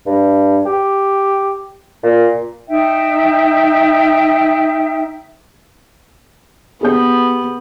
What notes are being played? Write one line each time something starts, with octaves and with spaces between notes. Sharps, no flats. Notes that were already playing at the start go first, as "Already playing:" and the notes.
G2
G4
A#2
D#4 E5 G5
B3 G4 G#4 G6